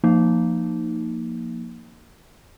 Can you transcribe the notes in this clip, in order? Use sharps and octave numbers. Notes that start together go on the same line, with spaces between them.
F3 A#3 D#4